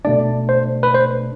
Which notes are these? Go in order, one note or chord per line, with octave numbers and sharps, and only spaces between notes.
B2 A3 D4 D5
C5
B4
C5